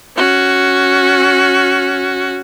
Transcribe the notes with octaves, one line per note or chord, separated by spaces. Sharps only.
C#4 F#4